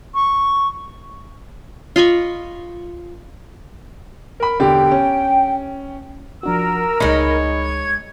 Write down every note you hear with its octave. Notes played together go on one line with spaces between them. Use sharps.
C#6
F4 D#5 B5 C#6
A#4 B5
E1 D3 G4 G5
C#4
F3 D4 F#4 A#4 E6
C#2 G#3 D#4 C#5 B5
G#6